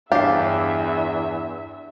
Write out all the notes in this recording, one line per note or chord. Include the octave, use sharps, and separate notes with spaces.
E2 G2 D4 G4 C#5 E5 F5 C7